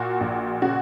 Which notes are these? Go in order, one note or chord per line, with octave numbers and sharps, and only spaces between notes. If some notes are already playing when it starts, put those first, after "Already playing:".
Already playing: A#2 F#4
A#1
C#3 F#4